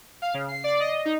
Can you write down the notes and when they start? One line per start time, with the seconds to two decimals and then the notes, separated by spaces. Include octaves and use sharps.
0.22 F5
0.34 C#3
0.48 C7
0.64 D5
0.80 D#5
1.05 D#4